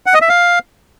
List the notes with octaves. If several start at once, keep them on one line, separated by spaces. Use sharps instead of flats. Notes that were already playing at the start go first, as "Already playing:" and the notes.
F#5
D#5
E5
F5